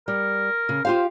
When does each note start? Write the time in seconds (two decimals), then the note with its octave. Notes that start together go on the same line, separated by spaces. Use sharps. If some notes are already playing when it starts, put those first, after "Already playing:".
0.08 G3 A#4
0.69 C#3
0.85 F4 G4 C5 F5